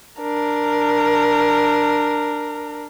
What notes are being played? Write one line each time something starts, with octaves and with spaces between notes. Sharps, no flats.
D4 A#4